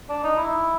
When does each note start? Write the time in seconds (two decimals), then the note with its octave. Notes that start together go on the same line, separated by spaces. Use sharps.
0.09 D4
0.24 D#4
0.37 E4